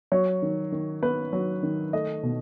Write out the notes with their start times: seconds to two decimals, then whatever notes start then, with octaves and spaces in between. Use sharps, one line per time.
0.12 F#3 C#5
0.42 D#3
0.72 D#3
1.02 B3 B4
1.33 F#3
1.63 D#3
1.93 A3 D#5
2.23 B2